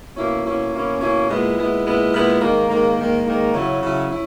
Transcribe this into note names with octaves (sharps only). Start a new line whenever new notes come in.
B2 A#3 C#4 E4
B2 A#3 C#4 E4
B2 A#3 C#4 E4
B2 A#3 C#4 E4
A#2 G#3 B3 E4
A#2 G#3 B3 E4
A#2 G#3 B3 E4
A#2 G#3 B3 E4
G#2 D#3 A#3
G#2 D#3 A#3
G#2 D#3 A#3
G#2 D#3 A#3
C#3 F#3 C#4 E4
C#3 F#3 C#4 E4
C#4 E4